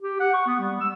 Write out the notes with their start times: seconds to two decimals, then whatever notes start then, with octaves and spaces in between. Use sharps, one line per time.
0.02 G4
0.20 F#5
0.33 C#6
0.47 B3
0.60 G3
0.81 E6